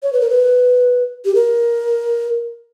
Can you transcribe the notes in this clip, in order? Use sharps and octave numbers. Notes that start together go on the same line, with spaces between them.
C#5
B4
A#4
B4
G4
A#4